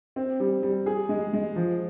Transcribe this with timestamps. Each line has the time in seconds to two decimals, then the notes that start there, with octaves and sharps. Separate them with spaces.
0.16 C4
0.40 G3
0.63 G3
0.86 G#4
1.09 G#3
1.33 G#3
1.56 F3